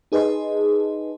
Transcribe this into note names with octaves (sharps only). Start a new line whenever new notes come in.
D#4 G#4 B4 D#5 A5 C6